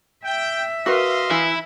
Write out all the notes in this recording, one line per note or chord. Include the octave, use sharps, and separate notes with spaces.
E5 G5
F#4 A#4 B4 D#5 F5 C6
E3 E4